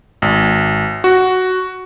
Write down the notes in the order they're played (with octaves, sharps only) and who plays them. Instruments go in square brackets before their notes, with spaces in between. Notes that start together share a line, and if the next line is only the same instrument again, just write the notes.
[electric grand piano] G#1
F#4